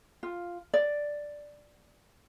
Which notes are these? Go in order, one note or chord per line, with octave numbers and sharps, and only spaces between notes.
F4
D5